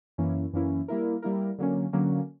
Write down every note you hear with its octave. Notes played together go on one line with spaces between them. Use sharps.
F#2 E3 A#3 C#4 E4
F#2 E3 A#3 C#4 E4
G3 A#3 E4 A#4
G3 A#3 E4 A#4
D3 F#3 A#3 C#4
D3 F#3 A#3 C#4